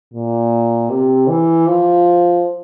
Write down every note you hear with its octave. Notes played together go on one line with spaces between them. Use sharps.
A#2
C3
E3
F3